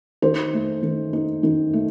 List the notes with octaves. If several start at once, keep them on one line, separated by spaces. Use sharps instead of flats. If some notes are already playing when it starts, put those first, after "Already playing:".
D#3 C5
A3
D#3
D#4
D#3
A3